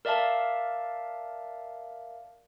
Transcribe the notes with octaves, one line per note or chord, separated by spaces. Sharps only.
A#4 D5 E5 F5 A5